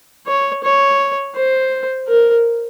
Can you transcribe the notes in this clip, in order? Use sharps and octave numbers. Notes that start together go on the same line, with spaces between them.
C#5
C#5
C5
A#4